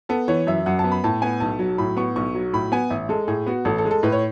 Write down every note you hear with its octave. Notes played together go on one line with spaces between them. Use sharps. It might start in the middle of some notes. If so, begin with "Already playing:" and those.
B3 A4
E3 C#5
F#2 E5
F#2 F#5
A5
B3
B5
A2 A5
B3 G#5
B1 A5
F#3
A2 B5
B3 C#6
B1 C#6
F#3
A2 B5
B3 G#5
A1 E5
G#3 A4
A2 G#4
B3 F#4
A1 A4
A4
G#3
A4
A2 B4
C#5